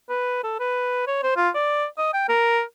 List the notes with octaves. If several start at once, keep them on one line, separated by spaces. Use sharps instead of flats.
B4
A4
B4
C#5
C5
F4
D5
D#5
G5
A#4